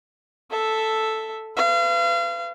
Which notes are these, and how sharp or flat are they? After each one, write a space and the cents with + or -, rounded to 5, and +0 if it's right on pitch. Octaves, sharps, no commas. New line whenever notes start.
A4 +0 E5 +0
B4 +30 F5 -35